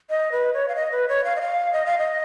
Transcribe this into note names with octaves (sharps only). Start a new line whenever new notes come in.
D#5
B4
C#5
F5
D#5
B4
C#5
F5
D#5
F5
D#5
F5
D#5